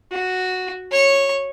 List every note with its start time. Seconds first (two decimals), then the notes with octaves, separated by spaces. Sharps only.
0.11 F#4
0.91 C#5 C#6